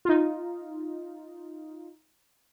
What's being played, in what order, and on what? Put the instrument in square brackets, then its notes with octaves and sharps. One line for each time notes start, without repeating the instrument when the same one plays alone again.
[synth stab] D#4 F4